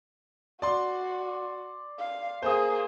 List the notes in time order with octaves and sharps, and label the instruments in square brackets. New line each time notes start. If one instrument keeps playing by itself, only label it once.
[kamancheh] F#4 [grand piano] D5 C6
[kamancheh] F5
[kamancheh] A#3 G#4 [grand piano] C5 D#6